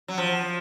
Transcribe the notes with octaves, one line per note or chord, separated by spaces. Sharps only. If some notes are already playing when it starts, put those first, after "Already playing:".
F#3
F3